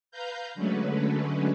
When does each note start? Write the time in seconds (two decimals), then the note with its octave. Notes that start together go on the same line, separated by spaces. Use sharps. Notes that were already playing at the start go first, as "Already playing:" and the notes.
0.11 B4 F5 A#5 G6
0.55 D3 F#3 G#3 A3 C#4 B4